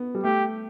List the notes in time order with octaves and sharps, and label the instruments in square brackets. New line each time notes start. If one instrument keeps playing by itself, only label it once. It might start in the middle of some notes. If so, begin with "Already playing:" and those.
Already playing: [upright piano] B3
G3
[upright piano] A3 [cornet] G4